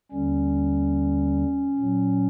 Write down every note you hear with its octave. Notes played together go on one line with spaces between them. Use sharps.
D#2 D3 G3 C#4
A#2 F#3